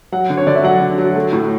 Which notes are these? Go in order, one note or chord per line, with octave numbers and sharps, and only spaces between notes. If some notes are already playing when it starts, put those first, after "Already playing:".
F#3 F#5
D3
C#5
D3 D5
E5
F#3 F#5
D3
F#3
A3
A2